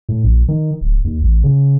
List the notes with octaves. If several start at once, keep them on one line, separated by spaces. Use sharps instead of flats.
A2
A#1
D#3
D1
D#2
A1
C#3